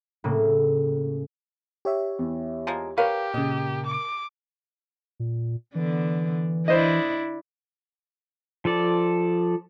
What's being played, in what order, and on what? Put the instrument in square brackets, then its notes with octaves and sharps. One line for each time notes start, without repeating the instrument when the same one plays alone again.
[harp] A2 C#3 A#3
[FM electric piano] G4 C#5 E5
[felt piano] E2
[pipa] F3 G#3 A#3
[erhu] G4 [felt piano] A#4 [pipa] B4 C#5 F5
[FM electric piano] A#2 C#3 [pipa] D#5
[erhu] D6
[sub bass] A#2
[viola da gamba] D3 B3 D4 [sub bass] E3
[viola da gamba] D4 E4 [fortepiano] C5 D#5
[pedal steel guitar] F3 A4 D5